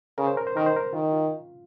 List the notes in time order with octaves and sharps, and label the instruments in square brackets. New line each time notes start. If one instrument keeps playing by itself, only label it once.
[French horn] C#3 [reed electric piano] A#4
[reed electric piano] C5
A#4
C5
[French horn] D#3 [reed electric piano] A#4
[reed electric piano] C5
A#4
[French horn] D#3 [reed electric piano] F4
[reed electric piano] F4